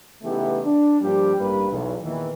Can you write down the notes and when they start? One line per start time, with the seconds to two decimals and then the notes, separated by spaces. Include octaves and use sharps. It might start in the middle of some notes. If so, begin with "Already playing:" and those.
0.22 C#3 E3 A3 B3 D#4 G4
0.64 D4
1.01 G2 F3 G3 A#3 D4 G4
1.37 A1 G2 G3 A#3 B4
1.70 B1 E2
2.02 E2 A#2 D#3 E3